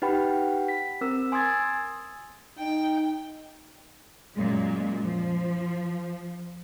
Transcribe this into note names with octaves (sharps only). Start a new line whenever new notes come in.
D#4 G4 B4 F#5 G5 B5
B6
C4 A#4 E6
G#5 C6 D#6 E6 G#6 A6
D#4 G5
F#2 A#2 G#3
F3